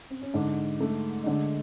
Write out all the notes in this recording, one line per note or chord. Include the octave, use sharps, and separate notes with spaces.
C4
C#4
G#2 D3 D4
A3
D#4
D3 G#3 D4